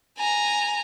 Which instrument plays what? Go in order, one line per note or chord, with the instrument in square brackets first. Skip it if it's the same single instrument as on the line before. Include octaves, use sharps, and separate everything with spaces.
[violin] G#5 A#5